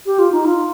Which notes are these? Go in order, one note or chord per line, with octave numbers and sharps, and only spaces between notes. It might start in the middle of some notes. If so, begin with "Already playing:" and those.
G4
F4
D#4
F4